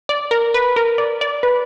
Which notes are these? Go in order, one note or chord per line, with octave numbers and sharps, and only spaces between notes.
D5
A#4
B4
A#4
D5
D5
B4